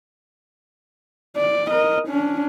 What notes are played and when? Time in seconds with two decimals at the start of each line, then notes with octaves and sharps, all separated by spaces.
1.37 D5
1.70 A#4 D#5
2.08 C#4 D4